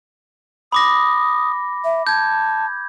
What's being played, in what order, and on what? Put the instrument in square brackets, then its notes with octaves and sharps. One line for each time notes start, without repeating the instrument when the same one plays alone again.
[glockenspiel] B5 D6 A#6 [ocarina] D#6
[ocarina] E5
[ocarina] A5 [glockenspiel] G6 G#6